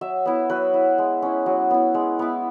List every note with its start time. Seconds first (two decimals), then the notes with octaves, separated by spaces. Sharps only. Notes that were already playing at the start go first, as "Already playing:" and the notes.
0.01 F#3 E5
0.26 B3 E4
0.50 F#3 B4
0.74 E4
0.98 G#3
1.22 C#4 E4
1.46 F#3
1.70 B3 E4
1.94 G#3
2.19 B3 E4